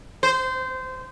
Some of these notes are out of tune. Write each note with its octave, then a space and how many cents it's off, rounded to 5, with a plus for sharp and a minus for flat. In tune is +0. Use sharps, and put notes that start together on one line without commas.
C5 -20